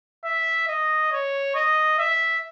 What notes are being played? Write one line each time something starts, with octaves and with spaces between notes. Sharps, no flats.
E5
D#5
C#5
D#5
E5